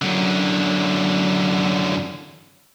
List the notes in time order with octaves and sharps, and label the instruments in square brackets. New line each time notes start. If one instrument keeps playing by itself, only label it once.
[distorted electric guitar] F#2 D3